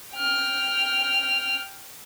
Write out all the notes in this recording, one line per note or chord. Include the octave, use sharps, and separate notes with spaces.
G5 F6